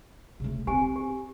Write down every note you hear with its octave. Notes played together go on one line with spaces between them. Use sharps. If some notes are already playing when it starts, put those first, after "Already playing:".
C#3 A3
C4 G4 G#5
G4